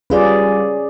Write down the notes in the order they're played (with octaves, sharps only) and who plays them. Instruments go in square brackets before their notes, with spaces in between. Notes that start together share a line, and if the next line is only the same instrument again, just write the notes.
[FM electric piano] G3 F4 B4 [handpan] C#4 G#4 D5